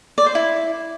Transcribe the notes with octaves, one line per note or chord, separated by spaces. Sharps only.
D5
C5
E4